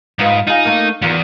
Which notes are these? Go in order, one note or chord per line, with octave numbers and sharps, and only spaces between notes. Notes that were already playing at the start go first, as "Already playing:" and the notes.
G#2 D#4 F4 B4
D#4 F4 G#4
A3 A#3
E2 D#3 F4